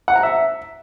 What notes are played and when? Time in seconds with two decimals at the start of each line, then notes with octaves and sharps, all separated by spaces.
0.08 F#5
0.16 A#5
0.23 E5